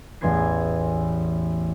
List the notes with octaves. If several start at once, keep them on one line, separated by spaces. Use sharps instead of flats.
A1 E2 B3 C6 G#6 C7